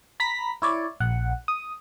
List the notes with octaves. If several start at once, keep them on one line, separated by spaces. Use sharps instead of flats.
A#5 B5 A#6 B6
E4 C#5 D5
A#1 F#5
D#6